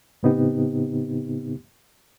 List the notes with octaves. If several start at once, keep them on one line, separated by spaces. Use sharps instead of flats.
A2 C#3 B3 C4 D#4 G4